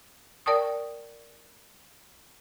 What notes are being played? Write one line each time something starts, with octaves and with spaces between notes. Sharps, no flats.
A#4 D5 G5 A5 C#6 D#6